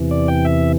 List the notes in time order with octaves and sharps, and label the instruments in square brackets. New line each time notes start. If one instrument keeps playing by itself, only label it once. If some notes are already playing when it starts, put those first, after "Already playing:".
Already playing: [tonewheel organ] E2 C3 E3
D5
G5
E5